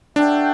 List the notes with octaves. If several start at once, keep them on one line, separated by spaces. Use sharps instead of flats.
D4 F#4 A4 E5 G5